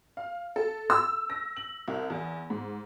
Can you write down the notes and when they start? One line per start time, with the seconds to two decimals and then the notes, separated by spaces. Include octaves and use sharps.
0.17 F5
0.56 A4
0.90 E6
1.30 A#6
1.57 F#7
1.88 C2
2.10 E2
2.50 G#2